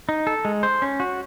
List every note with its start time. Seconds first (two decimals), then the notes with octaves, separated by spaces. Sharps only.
0.09 D#4
0.27 A4
0.45 G#3
0.63 C5
0.82 C#4
1.00 F#4